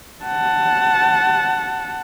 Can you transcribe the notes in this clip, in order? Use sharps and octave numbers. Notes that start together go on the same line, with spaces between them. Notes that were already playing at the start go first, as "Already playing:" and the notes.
F#5 A5